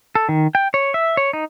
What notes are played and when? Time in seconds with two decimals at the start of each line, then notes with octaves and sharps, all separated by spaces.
0.15 A4
0.29 D#3
0.55 G5
0.74 C#5
0.94 E5
1.17 C#5
1.33 D#4